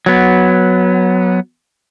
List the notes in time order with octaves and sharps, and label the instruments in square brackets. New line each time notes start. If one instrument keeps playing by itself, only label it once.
[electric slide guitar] F#3 B3